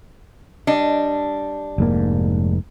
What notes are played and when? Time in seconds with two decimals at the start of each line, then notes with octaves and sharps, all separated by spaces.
0.67 G3 D4 D#5
1.78 F1 G#2 A#3